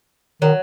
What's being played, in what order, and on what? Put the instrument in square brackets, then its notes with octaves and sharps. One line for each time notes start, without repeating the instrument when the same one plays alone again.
[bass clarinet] D#3 [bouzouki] F#3